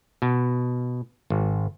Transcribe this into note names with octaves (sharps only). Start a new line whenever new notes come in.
B2
G#1